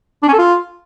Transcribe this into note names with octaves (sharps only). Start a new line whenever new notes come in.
D4
C#4
A4
F4